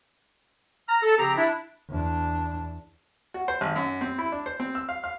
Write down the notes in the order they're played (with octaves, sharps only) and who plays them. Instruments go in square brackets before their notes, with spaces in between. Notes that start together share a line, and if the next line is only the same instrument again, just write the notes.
[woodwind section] A#5 F6
A4
C#3 F3 C4 G4 A#5
D4 E4
[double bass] E2 D4
[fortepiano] F#4
C5
G#1
F#2
C4
E4
D4
C5
C4
E6
F5
F5